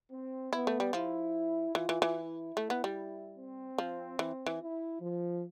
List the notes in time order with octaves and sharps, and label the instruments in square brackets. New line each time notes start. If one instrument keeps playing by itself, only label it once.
[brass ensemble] C4
[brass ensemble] B3 [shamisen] E4
[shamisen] A3
G3
[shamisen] F3 [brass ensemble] E4
[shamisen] E3 [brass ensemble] F4
[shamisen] E3
E3
[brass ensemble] E4
[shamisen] A3
B3
G3
[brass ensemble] C4
[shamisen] F3
E3
E3
[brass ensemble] E4
F3